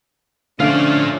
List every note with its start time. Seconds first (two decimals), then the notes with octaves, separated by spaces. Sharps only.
0.60 D3 F3 A3 C#4 F4 D5 F5